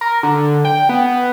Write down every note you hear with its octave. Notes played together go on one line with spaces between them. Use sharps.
A#4
D3
G5
B3